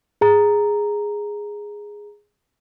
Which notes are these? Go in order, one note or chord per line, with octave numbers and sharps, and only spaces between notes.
G#4 A#5